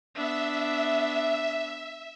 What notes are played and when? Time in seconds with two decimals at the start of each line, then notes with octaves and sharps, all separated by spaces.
0.15 B3 D4 E5